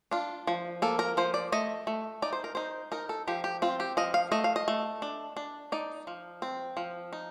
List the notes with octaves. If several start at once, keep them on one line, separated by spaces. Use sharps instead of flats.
D4 F4
F3
A#3 A4
A#4
F3 C5
D5
A3 D#5
A3
D#4 D5
C5
A#4
D#4 C5
D#4 A#4
A4
F3 G4
G4
C4 F4
G4
F3 D#5
F5
A3 D#5
F5
D#5
A3
D4
D4
D#4 D5
F3
C4
F3
D#4